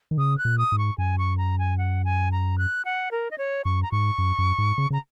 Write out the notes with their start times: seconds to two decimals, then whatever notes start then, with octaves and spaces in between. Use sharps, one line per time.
0.11 D#3
0.17 C#3 D#6
0.38 F#6
0.45 A#2
0.58 D#6
0.72 G#2
0.78 C#6
0.98 F#2 G#5
1.18 C#6
1.38 A#5
1.59 G#5
1.78 F#5
2.05 G#5
2.32 A#5
2.58 F#6
2.85 F#5
3.11 A#4
3.31 D#5
3.38 C#5
3.65 F#2 C#6
3.83 A#5
3.92 G#2 C#6
4.18 F#2
4.38 F#2
4.58 G#2
4.78 C#3
4.90 C#3
4.93 A#5